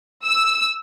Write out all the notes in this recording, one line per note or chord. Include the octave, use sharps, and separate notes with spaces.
E6